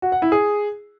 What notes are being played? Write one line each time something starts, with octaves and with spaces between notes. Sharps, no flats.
F#4
F#5
E4
G#4